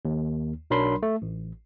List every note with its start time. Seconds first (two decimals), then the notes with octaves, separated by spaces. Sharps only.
0.05 D#2
0.70 B1 F#3 D4 A#4 B5 C6
1.03 A3
1.22 A1